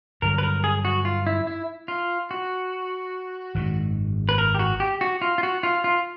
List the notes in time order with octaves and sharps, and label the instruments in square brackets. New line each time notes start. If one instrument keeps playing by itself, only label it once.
[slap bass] G2 D3 F#3 [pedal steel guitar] A#4
[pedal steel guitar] B4
A#4
G#4
F#4
F4
E4
E4
F4
F#4
[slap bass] G#1 F#2 D#3
[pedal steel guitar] B4
A#4
G4
F#4
G4
F#4
F4
F4
F#4
F4
F4